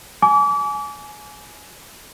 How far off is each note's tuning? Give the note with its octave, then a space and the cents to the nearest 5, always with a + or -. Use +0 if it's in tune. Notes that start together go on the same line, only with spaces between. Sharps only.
G#5 +20 D6 -35